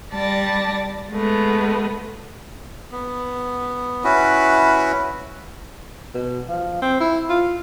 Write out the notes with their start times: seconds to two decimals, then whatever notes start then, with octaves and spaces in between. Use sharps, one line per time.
0.12 G3 D5 A5 A#6
1.11 G#3 A3 B3
2.92 B3
4.04 C#4 E4 F#4 B4
6.14 B2
6.49 F3
6.82 C4
7.00 E4
7.30 F4